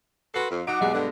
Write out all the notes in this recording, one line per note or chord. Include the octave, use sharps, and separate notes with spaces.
F#4 A4 B4 C6 C7
F2
F#3 D#4 F#5 D6 F#6 D7
B1 E2 G3 G#3 B3 G#4
G2 D3